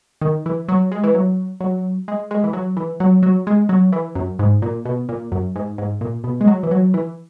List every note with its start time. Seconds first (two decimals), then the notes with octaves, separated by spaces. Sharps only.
0.21 D#3
0.46 E3
0.68 F#3
0.92 G#3
1.04 E3
1.15 F#3
1.60 F#3
2.08 G#3
2.31 G#3
2.44 E3
2.53 F#3
2.77 E3
3.00 F#3
3.23 F#3
3.47 G#3
3.69 F#3
3.93 E3
4.15 F#2
4.39 G#2
4.62 A#2
4.85 B2
5.09 A#2
5.32 F#2
5.56 G#2
5.78 G#2
6.01 A#2
6.24 B2
6.41 G#3
6.47 F#3
6.63 E3
6.71 F#3
6.94 E3